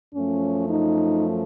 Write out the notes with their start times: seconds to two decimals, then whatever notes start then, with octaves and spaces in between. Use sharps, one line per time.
0.14 F#2 F3 A3 C#4
0.69 D#4